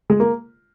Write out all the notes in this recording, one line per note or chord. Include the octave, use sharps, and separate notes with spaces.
G#3
A#3